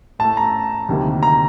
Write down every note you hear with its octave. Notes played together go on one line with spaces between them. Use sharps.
A2 A3 A5
A#5
D2 C3 D#3 G3 A#3
A#5